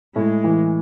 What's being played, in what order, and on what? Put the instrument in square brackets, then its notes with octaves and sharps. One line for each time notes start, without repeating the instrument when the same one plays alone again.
[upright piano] A2 [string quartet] G#3
[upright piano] E3